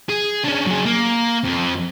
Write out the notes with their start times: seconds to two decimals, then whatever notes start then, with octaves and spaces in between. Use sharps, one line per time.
0.09 G#4
0.44 C#4 D4
0.67 F#3 G#4
0.86 A#3
1.44 F2